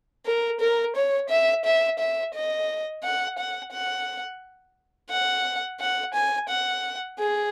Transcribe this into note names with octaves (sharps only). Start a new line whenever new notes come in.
A#4
A#4
C#5
E5
E5
E5
D#5
F#5
F#5
F#5
F#5
F#5
G#5
F#5
G#4